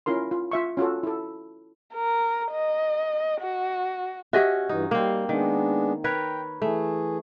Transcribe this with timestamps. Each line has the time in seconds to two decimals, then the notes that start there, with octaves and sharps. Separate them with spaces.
0.06 C#4 E4 F4 A#4 C6
0.31 F4
0.51 F4 E5 C#6
0.77 C#4 F4 F#4 A4
1.03 E4 A4
1.94 A#4
2.52 D#5
3.41 F#4
4.33 C#4 F#4 G4 D#5 E5
4.69 G2 E3 D#4
4.91 G3 A#3 C4
5.29 D#3 G#3 B3 D4
6.04 A#4 B4 C#5 G5
6.62 E3 A3 G#4